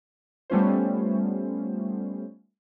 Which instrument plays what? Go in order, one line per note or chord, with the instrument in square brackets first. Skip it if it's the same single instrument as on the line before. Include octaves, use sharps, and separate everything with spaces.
[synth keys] G3 A3 B3 C#4 F4 C5